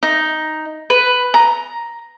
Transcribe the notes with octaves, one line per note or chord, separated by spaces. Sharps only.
D#4
B4
A#5